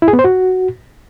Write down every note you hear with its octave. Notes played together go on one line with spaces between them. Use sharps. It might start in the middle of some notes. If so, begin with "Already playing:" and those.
E4
G#4
B3
C5
F#4